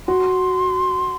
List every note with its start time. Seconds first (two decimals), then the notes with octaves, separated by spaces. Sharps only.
0.08 F#4 C6